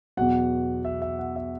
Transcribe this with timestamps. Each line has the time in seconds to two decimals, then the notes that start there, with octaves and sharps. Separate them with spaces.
0.17 E2 B2 F#3 F#5
0.85 E5
1.02 E5
1.19 F#5
1.36 E5